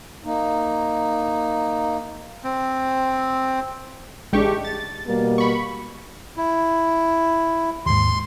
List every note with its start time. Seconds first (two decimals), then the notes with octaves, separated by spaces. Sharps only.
0.24 A#3 D#4
2.44 C4
4.33 A1 G#3 D4 G4 C#6
4.65 A6
5.08 B2 G3 A#3
5.38 B5 C#6
6.37 E4
7.86 D#2 G#2 C6